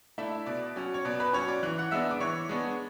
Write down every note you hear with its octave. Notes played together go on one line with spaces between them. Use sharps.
A3 D4 E4 E5
B2 D5
F#3 C#4
C#5
B2 D5
B4 B5
F#3 C#4 C#5 C#6
D5 D6
E3 F#6
F#5 F#6
G#3 B3 D4 E5 E6
D6
E3 C#5 C#6
G#3 B3 D4